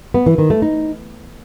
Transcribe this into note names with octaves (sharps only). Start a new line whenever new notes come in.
B3
E3
D#3
A3
D#4